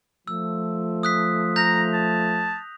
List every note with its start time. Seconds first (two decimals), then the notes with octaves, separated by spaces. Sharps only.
0.27 F3 A3 E6
1.03 D#6 F#6 B6
1.56 A#5 G6 A#6 F7
1.93 A5